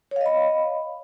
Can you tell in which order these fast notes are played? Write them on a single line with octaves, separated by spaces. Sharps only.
C#5 F5 D#5 B5